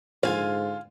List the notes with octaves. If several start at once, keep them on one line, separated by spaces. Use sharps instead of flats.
A#1 G#2 D3 F4 F5 G#5